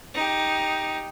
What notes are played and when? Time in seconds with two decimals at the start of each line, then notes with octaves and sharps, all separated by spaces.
0.14 D#4 G4